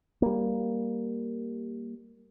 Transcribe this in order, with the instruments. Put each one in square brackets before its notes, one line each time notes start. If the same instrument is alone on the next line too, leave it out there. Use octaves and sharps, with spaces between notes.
[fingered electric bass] G3 A#3